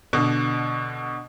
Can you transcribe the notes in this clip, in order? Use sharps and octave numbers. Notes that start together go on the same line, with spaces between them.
B2 D3